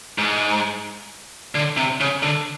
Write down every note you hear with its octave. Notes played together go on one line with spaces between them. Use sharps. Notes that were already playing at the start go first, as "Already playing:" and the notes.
G#2
D3
C3
C#3
D3